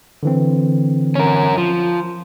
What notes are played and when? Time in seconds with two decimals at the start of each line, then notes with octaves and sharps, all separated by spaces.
0.23 D3 E3 C4
1.15 C#4 A#4
1.58 F3